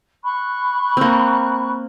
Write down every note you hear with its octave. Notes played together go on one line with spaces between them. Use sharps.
B5 C#6 F#6
A#3 C4